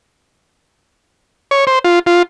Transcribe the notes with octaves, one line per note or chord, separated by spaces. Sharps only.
C#5
C5
F4
F4